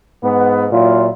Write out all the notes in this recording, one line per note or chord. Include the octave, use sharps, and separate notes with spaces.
G#2 B3
A#2 F#3 E4 F4